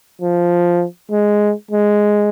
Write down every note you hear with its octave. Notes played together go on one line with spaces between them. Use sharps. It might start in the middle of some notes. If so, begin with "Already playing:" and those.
F3
G#3
G#3